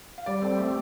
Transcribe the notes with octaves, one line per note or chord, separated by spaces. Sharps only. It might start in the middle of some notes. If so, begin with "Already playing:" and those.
F5
G3 D5
C4 A4
A3 G4